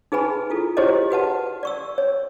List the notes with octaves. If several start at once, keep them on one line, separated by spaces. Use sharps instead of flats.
D#4 G#4 B4 G#5 B5
E4 F4 A4
E4 G4 G#4 C5 C#5 D#5
F#4 B4 F#5 A5
D5 C#6 E6
C#5